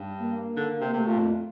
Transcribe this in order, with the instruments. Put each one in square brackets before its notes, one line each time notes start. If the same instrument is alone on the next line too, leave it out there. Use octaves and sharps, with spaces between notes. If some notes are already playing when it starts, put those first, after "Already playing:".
Already playing: [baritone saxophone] G2
[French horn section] A#3
[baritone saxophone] D3
C3
[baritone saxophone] C3 [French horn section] A3
[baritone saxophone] A#2
F2